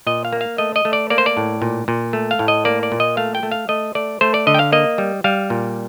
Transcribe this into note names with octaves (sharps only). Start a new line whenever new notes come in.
A#2 D#5
F5
A#3
F5
A3 D#5
D#5
A3
D5
A#3 D5
C5
D5
A2
A#2
A#2
A3
F5
A2
D#5
A#3 D5
D5
A#2
D#5
A3 F5
G5
A3
F5
A3 D#5
A3 D5
A3 C5
D5
D3 D#5
G5
F5
A#3 D#5
G3
G3 F5
A#2